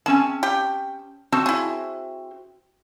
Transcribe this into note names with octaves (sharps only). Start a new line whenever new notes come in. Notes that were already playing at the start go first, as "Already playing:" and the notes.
C4 C#4 G#4 A5
G4 G5
C4 F#4 A4 C5
E4 G#4